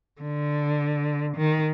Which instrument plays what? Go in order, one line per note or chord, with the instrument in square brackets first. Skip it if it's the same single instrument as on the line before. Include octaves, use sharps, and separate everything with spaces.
[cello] D3
D#3